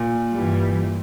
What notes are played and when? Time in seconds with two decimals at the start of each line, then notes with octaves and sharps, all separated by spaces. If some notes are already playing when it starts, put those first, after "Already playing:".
Already playing: A#2
0.34 G2 E3 G3